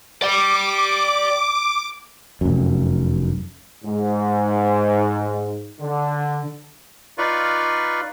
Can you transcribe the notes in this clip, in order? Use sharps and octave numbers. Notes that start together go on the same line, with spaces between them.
D5 G5 D6
F1 F#2
G#2
D3
D#4 F4 B4 D5 F5 C#6